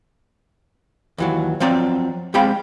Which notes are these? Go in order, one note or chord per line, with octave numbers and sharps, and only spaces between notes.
D#2 E3 F#3
F3 F#3 C4 D5 A#5
G#3 C4 G4 F5 G5 B5